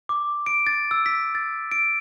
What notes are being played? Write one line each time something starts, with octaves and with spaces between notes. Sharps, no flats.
D6
D7
A6
E6
B6
A6
D7